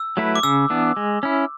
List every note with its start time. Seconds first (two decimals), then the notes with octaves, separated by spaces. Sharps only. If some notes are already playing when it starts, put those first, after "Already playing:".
Already playing: E6
0.17 F#3 A3 E4 B4
0.36 D6
0.43 C#3 E6
0.70 E3 B3 D4
0.97 G#3
1.23 C#4 E4